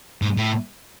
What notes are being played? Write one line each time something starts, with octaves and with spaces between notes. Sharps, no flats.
G#2
A2